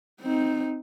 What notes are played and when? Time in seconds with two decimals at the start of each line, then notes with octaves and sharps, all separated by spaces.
0.21 C4 D#4